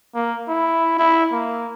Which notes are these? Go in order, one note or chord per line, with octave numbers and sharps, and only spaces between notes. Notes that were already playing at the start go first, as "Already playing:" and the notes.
A#3
E4
E4
A#3